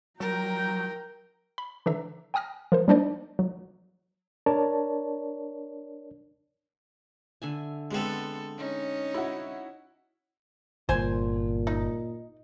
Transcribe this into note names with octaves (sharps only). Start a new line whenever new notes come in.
F#3 A#4 G5 A#5
B5
D3 E3 B4 E5 A#5
G5 G#5 D#6 F6 A#6
F3 A#4 C5
G3 A#3 D4 D#4 C5 D5
F#3
D4 A#4 C#5 D5 A5
D3 E5 G#5
G#3 B3 C4 A4
C#4 D#4
E4 F#4
G1 A#2 C5 G#5
D#4